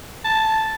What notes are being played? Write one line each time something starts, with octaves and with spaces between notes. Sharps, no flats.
A5